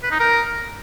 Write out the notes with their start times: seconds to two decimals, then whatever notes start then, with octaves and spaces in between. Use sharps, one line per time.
0.03 B4
0.11 D#4
0.20 A#4